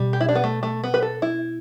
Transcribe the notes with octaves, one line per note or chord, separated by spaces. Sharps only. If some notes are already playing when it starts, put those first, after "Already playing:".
Already playing: B2 G3
G4
E4
D4
B3
A3
A3
B3
B4
A4
E4